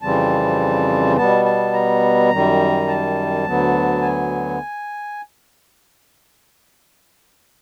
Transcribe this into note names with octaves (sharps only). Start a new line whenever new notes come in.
F2 C#3 E3 G3 C4 A5
B2 G3 B3 A5
A5
A#5
F#2 D#3 G3
A5
D2 D3 F#3 B3
G#5